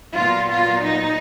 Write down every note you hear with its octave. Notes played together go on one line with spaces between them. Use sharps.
A#2 F#3 B3 F4
F4
D#4